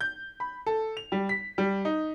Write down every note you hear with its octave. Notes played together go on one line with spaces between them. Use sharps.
G6
B5
A4
F7
G3
B6
G3
D#4